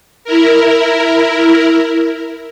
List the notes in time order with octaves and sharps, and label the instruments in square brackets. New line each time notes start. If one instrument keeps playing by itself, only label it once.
[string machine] E4 A#4